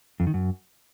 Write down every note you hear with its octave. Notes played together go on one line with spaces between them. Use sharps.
F2
D#3
F#2